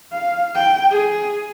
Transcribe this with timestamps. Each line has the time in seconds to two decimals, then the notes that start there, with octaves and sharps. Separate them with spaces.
0.12 F5
0.55 G5
0.91 G#4